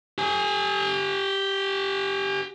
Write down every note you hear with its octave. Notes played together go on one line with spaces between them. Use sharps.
G4 G#5